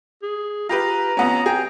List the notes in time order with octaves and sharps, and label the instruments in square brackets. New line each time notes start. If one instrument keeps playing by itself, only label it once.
[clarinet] G#4
[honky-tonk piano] F4 G4 B4 [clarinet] A#5
[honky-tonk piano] F2 B3 C#4
[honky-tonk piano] G#4 [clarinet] G5